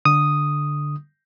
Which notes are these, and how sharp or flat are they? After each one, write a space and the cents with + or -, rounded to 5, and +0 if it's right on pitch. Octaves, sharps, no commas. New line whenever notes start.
D3 +0 D#6 +0